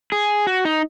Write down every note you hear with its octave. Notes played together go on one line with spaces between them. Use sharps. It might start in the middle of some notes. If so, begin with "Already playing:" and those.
G#4
F#4
D#4